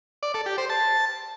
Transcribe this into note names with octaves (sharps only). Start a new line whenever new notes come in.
D5
A4
G4
C5
A5